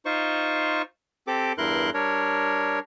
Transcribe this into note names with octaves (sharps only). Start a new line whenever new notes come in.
D#4 F4 C5 C#6
C4 G4 A4 D6
E2 G2 E4 A#4 C6 F#6
G3 D4 A#4 C#5